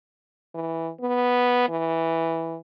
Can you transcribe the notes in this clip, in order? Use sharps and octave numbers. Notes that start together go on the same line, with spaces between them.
E3
B3
E3